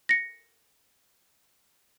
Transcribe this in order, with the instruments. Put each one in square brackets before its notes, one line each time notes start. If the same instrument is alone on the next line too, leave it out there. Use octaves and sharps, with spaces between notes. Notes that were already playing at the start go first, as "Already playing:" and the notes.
[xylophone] A#6 C#7